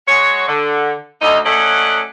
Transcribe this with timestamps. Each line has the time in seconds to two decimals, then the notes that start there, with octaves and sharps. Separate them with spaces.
0.08 F#3 G#3 F#4 C#5
0.48 D3
1.22 D2 D#4
1.45 F#3 A3 C#4 D5 D#5 F#5